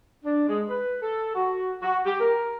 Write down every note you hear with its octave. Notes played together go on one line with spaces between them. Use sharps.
D4
G#3
B4
A4
F#4
F#4
G4
A#4